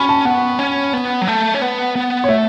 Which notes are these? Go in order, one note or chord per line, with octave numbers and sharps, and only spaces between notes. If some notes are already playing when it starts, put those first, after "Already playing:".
Already playing: C#4 B5 C#6
A5
B3 F#5
C#4
B3
F#3
A3
C#4
B3
B3
C#5
A3 E5